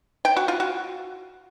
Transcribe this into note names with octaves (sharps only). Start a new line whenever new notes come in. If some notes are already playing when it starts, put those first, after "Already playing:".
G5
F#4
F4
F#4